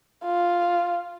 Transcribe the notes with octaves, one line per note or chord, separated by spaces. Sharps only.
F4